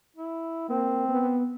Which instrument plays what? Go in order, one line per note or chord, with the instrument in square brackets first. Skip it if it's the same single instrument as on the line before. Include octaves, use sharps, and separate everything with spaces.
[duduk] E4
[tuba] A#3 [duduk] C4
[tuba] B3